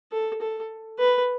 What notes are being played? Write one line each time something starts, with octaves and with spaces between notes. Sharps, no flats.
A4
A4
B4